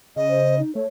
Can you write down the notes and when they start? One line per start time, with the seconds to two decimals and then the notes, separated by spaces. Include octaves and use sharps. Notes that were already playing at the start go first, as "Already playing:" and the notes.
0.16 C#3 D#5
0.29 C5
0.59 D#4
0.75 A3 C#5